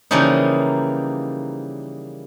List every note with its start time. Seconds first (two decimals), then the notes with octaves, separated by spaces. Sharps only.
0.11 C#3 E3 F3 G3 A#3 D#4